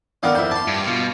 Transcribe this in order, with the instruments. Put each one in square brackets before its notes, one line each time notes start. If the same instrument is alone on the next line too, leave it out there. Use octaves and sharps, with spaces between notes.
[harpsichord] D3 D#3 B3 [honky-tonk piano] F5 D6 F6
[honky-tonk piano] F2 E4 [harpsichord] C5
[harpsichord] A5 C6 [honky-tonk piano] D6
[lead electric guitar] G2
[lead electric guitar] B2 [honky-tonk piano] F4